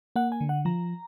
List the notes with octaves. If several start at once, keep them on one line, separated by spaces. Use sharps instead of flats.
A#3 F#5
G#5
D3
F#5
F3 A#5